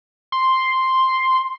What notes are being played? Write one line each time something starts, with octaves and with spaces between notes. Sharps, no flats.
C6